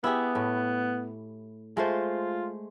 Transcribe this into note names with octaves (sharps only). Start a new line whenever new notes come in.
B3 E4 G4 G#4
A2
G#3 A3 F4 C5